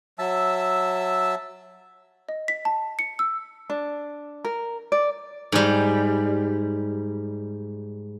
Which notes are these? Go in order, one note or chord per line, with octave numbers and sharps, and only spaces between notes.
F#3 E5 A5 E6
D#5
B6
A5
C#7
E6
D4
A#4
D5
G#2 G3